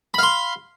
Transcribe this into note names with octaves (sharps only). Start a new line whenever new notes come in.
F5 B5 C6